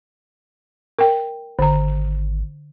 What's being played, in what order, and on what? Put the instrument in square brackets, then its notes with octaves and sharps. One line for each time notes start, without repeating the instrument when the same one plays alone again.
[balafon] A#4 G5
[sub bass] G#1 [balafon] D3 A#5